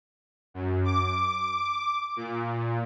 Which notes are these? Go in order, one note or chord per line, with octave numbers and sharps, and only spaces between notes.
F#2
D6
A#2